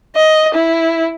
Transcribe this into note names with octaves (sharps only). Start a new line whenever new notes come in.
D#5
E4